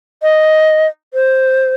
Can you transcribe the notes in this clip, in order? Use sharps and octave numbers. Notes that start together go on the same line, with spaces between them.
D#5
C5